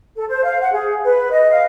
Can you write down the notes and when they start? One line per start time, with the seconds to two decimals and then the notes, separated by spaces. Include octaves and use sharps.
0.16 A4
0.28 C5
0.44 F5
0.60 F#5
0.72 G#4
1.04 B4
1.30 D#5
1.50 F5